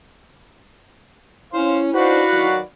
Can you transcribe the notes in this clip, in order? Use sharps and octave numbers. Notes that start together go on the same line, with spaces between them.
C#4 E4 C5 F5
D4 D#4 F#4 B4 C5 D5 F5
D#3 F#3